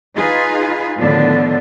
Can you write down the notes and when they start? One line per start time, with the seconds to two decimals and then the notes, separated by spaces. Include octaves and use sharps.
0.15 D#4 F4 G#4 B4
0.99 A2 D3 D#3 F3 B3 D4